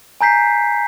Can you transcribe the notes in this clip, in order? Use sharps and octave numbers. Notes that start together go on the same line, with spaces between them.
G#5 A#5 G6 B6 C7